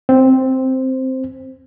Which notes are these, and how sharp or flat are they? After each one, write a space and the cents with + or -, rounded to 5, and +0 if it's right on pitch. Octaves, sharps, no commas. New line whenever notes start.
C4 +0 C5 +0